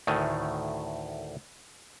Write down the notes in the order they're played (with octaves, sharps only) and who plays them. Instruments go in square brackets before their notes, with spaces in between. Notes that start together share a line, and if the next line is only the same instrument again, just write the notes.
[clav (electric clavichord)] D2 A2 D#3 A3 G#5